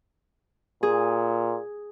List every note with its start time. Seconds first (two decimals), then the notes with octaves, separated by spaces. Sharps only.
0.83 A#2 G#4